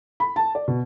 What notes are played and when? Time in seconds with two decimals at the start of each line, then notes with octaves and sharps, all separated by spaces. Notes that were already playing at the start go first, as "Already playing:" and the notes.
0.20 B5
0.36 A5
0.55 D5
0.68 B2